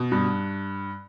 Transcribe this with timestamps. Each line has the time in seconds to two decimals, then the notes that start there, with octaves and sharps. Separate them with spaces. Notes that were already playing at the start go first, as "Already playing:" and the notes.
Already playing: B2
0.12 G2